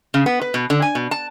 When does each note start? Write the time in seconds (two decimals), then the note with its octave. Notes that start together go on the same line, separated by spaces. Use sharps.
0.14 C#3
0.26 B3
0.41 B4
0.54 B2
0.70 D3
0.82 G#5
0.95 B2
1.11 A5